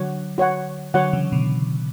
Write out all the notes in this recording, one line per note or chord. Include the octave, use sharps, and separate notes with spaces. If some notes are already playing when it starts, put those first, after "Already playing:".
Already playing: D3 F#3 F#4 C#5 F#5
F#4 C#5 F#5
D3 F#3 F#4 C#5 F#5
C#3 E3
B2 D3